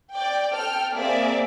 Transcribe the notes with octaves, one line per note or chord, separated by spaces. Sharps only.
D5 G5
A4 G5 F6
A#3 C4 G#4 D5 E5